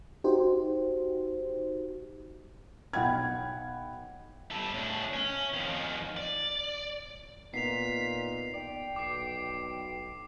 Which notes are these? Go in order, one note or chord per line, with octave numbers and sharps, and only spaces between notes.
D#4 F#4 G4 C5
B1 F#5 G5 B5 G#6
G3 A4
A2 D4
C#4
F2 D#3
D5
A#2 B3 D#4 B6 C7 F7
D5 G5
B1 D6 C7